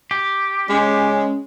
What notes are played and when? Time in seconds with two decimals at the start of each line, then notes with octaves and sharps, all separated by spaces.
0.11 G4
0.69 G#3 C#4